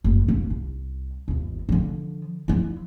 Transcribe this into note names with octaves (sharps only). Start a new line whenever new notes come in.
F#1
F#2 A#3
C2
G1 D#2
D3 F3
F3 E4